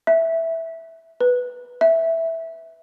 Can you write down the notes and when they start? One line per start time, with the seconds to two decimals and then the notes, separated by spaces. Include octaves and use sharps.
0.07 E5
1.21 B4
1.81 E5